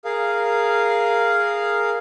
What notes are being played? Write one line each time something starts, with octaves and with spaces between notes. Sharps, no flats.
G#4 A#4 F5